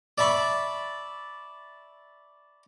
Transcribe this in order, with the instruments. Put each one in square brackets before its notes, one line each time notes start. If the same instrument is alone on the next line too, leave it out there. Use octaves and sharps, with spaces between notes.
[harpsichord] D5 E5 A5 B5 C#6